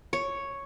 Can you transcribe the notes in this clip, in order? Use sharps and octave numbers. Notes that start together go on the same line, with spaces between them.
C#5